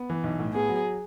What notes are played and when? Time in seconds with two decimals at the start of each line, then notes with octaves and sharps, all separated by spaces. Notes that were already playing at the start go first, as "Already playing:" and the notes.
Already playing: B3
0.10 E3
0.24 B1
0.40 A2
0.54 B3 G#4
0.69 F#3